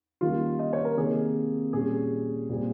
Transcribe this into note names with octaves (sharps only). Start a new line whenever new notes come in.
D#3 G3 A#3 C#4 F4
D#5
C#5
A#4
C3 D#3 A#3 G#4
A#2 G3 C#4 G#4
A#2 G3 C4